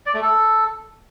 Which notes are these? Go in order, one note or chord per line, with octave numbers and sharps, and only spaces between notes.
D5
A3
A4